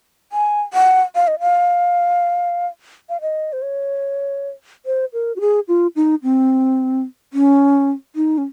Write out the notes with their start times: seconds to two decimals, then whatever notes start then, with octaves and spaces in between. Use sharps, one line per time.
0.32 G#5
0.73 F#5
1.15 F5
1.28 D#5
1.40 F5
3.09 F5
3.21 D#5
3.53 C5
3.62 C#5
4.86 C5
5.13 A#4
5.36 F#4
5.41 G#4
5.68 F4
5.96 D#4
6.23 C4
7.33 C#4
8.16 D#4
8.38 C#4